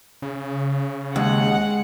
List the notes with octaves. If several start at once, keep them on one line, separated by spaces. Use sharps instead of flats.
C#3
D#2 G#3 F#5